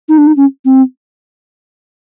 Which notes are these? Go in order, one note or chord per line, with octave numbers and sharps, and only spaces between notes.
D#4
D4
D#4
C#4
C4